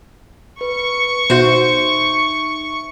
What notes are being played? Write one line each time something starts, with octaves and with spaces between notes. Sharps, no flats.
B4 C#6
B2 D#4 F#4 C5 E5